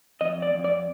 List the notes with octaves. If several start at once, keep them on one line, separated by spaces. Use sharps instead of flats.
F2 D#5
D5
F2
D5